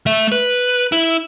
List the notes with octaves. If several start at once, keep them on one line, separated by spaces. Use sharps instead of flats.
A3 E5
B4
E4